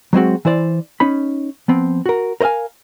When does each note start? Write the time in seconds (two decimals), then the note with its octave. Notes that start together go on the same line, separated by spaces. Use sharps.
0.13 F#3 G#3 C4 F#4
0.45 E3 E4 C5 D5
1.00 C#4 D#4 B5
1.68 F3 B3 C4
2.06 F#4 A#4
2.41 A#4 C5 D#5 F5 G#5